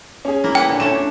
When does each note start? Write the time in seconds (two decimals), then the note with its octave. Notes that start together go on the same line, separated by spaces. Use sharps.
0.25 C#4 G#4
0.44 A#3 E4 A#4
0.55 A3 A#3 B4 G5
0.68 A#2 D3
0.80 A3 C#4 C#5 E7
0.94 D4